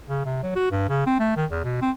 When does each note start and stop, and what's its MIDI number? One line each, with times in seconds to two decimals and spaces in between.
0.09 0.22 49
0.25 0.41 48
0.43 0.52 54
0.56 0.70 66
0.72 0.88 43
0.89 1.02 49
1.07 1.19 60
1.19 1.32 57
1.37 1.45 51
1.51 1.62 40
1.64 1.82 47
1.82 1.91 60